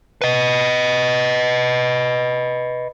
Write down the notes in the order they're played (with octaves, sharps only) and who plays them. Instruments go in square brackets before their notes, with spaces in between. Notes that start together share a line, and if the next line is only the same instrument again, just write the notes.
[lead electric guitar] B4 D#5